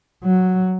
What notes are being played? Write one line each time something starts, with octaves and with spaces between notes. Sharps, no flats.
F#3